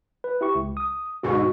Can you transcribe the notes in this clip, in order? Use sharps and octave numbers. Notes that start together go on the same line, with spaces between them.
B4
E4 G4 C#6
C#2
D#6
D2 G#2 B2 F#4 C#6